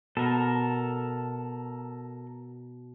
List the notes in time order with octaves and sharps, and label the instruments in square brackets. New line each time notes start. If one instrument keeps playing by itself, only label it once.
[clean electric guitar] B2 [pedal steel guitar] A4 A#4